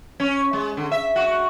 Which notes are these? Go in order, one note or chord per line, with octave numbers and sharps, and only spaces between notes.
C#4
G#3
D3
E5
F#4